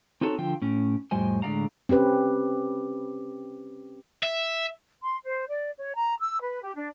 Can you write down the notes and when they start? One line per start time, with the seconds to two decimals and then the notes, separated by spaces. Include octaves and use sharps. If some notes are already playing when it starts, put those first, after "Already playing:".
0.21 C4 D#4 F#4 A4 C5 C#5
0.38 D3 F3 F4 G5
0.62 A2 C#4
1.11 F2 A2 G3 C5 D#5 G#5
1.42 A2 D3 G#3 D5 F5 A#5
1.89 C4 C#4 G4 B4
4.23 E5
5.02 C6
5.24 C5
5.47 D5
5.79 C#5
5.95 A#5
6.20 E6
6.42 B4
6.63 G4
6.75 D4